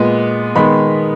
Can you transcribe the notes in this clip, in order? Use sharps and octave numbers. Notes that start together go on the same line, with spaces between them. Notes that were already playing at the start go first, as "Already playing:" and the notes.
Already playing: A#2 G#3 B3
D#3 G#3 B3 B5